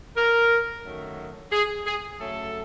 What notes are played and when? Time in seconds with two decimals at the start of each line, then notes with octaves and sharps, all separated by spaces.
0.17 A#4
0.84 F#2 D#3 F#3 A3
1.52 G#4
1.86 G#4
2.20 C#3 F#3 A3 A4